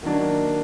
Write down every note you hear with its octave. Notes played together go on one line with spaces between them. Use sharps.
D#3 F#3 A#3 D4